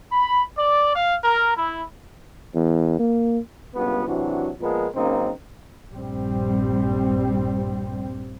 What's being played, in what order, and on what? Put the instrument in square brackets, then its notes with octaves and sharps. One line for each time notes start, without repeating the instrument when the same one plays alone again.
[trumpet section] B5
D5
F5
A#4
E4
[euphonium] E2
A#3
[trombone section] C#2 G2 A#2 B3
C3 E3 F#3 D4 F#4
A#2 F3 G#3 B3 A#4
F#2 C#3 A#3 C4 D#4
[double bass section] A#1 G2 G3 C4